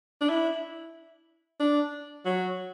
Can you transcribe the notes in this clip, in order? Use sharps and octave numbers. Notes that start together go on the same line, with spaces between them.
D4
E4
D4
F#3